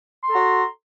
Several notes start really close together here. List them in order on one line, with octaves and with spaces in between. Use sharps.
C6 A4 A#5 F#4